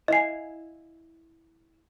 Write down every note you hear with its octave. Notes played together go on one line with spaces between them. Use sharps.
E4 D#5 F5 G#5 C7